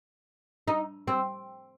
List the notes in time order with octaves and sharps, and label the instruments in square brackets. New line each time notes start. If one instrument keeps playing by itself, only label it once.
[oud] D#4
C4